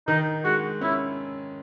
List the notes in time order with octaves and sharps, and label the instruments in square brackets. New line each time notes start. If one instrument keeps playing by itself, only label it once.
[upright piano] D#3 [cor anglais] D#4
[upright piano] G#3 [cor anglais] F#4
[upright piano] C#4 [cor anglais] E4